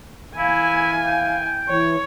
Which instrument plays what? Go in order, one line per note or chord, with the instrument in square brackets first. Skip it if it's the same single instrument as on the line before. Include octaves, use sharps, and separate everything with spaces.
[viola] E3 G#5 [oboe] E4 [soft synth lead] F5
[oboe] G5
[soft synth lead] E3 [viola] C#5